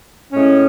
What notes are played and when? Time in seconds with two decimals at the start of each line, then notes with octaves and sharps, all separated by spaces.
0.33 A2 G#3 C#4